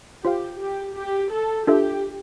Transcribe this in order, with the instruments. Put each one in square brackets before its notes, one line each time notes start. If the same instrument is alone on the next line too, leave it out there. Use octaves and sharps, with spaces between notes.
[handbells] F4 C5 F5 [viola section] G4
[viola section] G4
G4
A4
[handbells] D4 F4 A4 E5 [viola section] G4